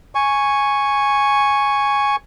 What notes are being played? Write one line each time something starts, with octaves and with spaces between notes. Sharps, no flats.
G#5 C#6